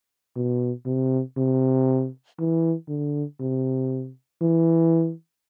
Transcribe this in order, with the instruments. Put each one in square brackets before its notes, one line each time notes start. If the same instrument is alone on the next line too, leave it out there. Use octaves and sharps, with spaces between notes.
[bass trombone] B2
C3
C3
E3
D3
C3
E3